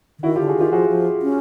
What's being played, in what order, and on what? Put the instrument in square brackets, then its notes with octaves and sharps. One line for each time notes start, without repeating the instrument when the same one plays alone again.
[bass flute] D3
[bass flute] D#3 [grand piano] E4 F#4
[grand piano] F4 G4
[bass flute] D3
[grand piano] F#4 G#4
[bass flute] D#3 [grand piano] F4 G4
[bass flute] F3 [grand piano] F#4 G#4
[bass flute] F3
C#4